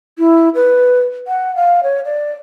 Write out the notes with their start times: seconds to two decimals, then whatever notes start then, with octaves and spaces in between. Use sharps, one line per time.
0.19 E4
0.55 B4
1.28 F#5
1.56 F5
1.83 C#5
2.05 D5